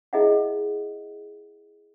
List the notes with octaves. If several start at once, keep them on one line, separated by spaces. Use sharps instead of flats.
E4 G#4 B4 D#5 E5 F#5